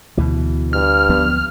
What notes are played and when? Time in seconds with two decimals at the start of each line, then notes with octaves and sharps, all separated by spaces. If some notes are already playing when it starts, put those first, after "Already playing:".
0.18 D2 B2 E3
0.73 G2 F6
1.09 F3 B3